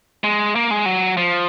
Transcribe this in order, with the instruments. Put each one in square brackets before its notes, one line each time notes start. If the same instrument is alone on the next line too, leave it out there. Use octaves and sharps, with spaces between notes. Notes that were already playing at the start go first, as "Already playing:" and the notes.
[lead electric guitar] G#3
A#3
G#3
F#3
F3